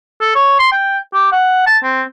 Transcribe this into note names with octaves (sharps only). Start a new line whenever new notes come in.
A4
C#5
C6
G5
G4
F#5
A5
C4